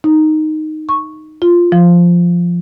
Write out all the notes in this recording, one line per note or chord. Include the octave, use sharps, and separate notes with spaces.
D#4
C#6
F4
F3